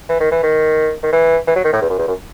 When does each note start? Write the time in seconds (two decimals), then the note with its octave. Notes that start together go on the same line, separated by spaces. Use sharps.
0.09 E3
0.20 D#3
0.31 E3
0.43 D#3
1.03 D#3
1.13 E3
1.47 E3
1.56 F#3
1.64 D#3
1.73 A2
1.81 E2
1.90 F#2
1.99 E2
2.08 F#2